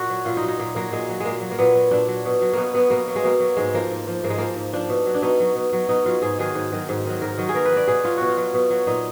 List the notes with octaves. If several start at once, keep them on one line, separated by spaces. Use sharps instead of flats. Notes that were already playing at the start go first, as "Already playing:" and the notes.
Already playing: A#2 F#4 A#4
F#3
A#2 F4
D#4
F#3
D#4
A#2 A#3
F#3 A#3
A#2 G#3
F#3
G#3
A#2 A#3
F#3
A#3
A#2 B3
F#3
A#2 D4
F#3
B2
F#3
B2 A#3 B3
F#3 B3
B2 A#3
F#3
G#3
B2 A#3
F#3
G#2 G#3
F3 A#3
G#2
F3
G#2 A#3
G#3
F3 A#3
G#2
F3 D4
B2
F#3
D4
B2 D#4
F#3
B2
F#3
B2 D#4
F#3 F4
G#2 G#4
D#3 F#3 G#4
G#2
D#3 F#3
G#2
D#3 F#3
G#2 A#4
D#3 F#3
G#4
B2 A#4
B4
F#3 D5
B2 G#4
F#3 F4
B2 F#4
F4
F#3
B2
F#3
A#2 D#4